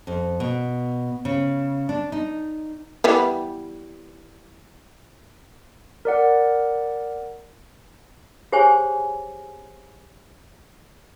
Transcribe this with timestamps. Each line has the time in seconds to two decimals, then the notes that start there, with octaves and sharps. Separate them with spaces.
0.07 F2
0.40 B2
1.25 C#3
1.89 D4
2.12 D#4
3.04 E3 G3 B3
6.05 A#4 D5 F#5
8.52 G4 G#4 C5 C#5 G#5